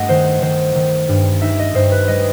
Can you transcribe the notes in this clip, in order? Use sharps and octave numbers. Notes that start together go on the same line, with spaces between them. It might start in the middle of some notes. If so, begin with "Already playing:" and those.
Already playing: G2 A3 D#5 F#5
D#3 C5
D#3 C5
D#3
G2
D#4 E5
D#5
G2 C5
B4
G3 D#5